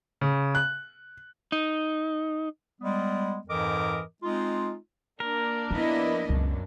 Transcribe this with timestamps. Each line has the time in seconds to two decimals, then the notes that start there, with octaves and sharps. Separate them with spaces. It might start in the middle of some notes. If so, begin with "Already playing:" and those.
0.21 C#3
0.55 F#6
1.52 D#4
2.81 G3 G#3 B3
3.48 F2 G#2 E3 A#4 D#5 D6
4.23 G#3 C4 D#4 F4
5.20 A#3 D4 A#4
5.71 F3 B3 E4 D#5
6.29 C#2 F#2 B2